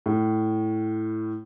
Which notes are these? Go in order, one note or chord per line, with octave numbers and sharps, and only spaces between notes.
A2